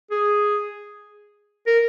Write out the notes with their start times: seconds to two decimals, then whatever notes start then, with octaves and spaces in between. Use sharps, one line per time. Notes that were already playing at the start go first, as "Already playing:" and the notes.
0.11 G#4
1.67 A#4